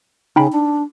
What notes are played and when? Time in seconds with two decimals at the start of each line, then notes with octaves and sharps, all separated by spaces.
0.36 C#3 D#4 G5 B5
0.52 D4